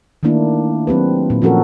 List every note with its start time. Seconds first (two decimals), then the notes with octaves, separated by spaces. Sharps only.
0.23 D#3 A3 A#3 D4 E4
0.87 F#3 C4 G4 B4
1.30 A#2
1.42 F3 C#4 F#4 A4 A#4